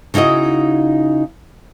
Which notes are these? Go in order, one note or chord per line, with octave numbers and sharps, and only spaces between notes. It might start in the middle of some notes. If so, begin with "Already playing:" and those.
C#3 D#4 E4 F#4 D#5